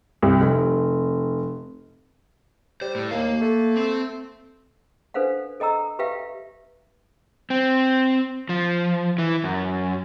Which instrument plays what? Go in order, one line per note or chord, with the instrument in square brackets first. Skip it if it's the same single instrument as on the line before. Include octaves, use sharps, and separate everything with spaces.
[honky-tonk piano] C2
F1
[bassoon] G3 [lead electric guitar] C5
[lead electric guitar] A2
[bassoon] D#2 [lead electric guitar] A#3 F5
[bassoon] A3
[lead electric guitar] C4
[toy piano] D4 A4 B4 C5 F5 F#5
A4 D#5 G5 A#5 E6
G4 B4 E5 F5 G5
[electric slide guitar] C4
F3
E3
F#2